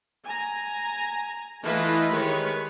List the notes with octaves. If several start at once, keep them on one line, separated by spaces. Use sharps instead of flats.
G#5 A#5
E3 A3 E4 F4 B4 D#5
D#3 G#3 G4 B4 C#5